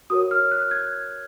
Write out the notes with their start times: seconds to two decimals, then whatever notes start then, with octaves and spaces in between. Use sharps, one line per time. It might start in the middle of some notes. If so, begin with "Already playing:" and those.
0.10 F#4 A#4 C#5 D#6
0.31 F6
0.51 F#6
0.71 G#6